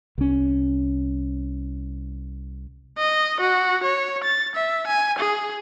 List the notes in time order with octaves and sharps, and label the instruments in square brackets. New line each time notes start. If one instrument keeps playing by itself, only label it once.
[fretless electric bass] C2 C#4
[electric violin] D#5
F#4
C#5
A6
E5
G#5
G#4